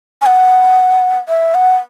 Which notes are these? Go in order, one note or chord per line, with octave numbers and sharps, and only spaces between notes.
G#5
F#5
E5
F#5